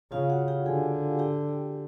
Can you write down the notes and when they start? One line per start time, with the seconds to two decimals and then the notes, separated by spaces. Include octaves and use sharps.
0.12 C#3 F4 F5
0.30 F#4 F#5
0.48 G4 G5
0.66 D3 G#4 G#5
1.19 G4 G5